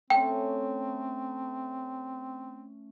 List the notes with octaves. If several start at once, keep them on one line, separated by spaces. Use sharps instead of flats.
A3 C4 C#4 G5